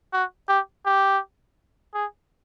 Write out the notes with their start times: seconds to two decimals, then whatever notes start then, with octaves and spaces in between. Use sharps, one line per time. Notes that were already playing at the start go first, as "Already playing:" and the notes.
0.13 F#4
0.49 G4
0.86 G4
1.94 G#4